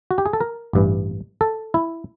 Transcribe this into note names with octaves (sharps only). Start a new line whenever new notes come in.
F#4
G4
G#4
A4
A#4
A1 G2 E3
A4
E4